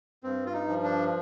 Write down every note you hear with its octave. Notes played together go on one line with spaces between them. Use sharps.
G2 C4
F4
D#4
F3
D4